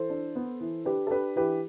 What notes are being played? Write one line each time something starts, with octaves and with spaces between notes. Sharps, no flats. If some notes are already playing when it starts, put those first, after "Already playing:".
Already playing: E3 A4 C5
D4
B3
E3
D4 G4 B4
A4
D4 G4 B4
E3 G4 B4